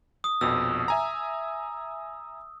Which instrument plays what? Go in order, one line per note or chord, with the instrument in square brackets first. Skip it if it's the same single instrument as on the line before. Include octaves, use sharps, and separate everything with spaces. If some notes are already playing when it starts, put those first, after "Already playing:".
[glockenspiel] D#6
[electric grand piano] A#1 F2 B2 [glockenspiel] E6
[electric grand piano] E5 G#5 A#5